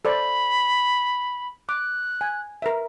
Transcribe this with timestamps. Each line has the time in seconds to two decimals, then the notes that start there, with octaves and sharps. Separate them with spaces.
0.05 A4 C5 D5 B5
1.69 D6 F#6
2.21 G#5
2.62 A#4 B4 E5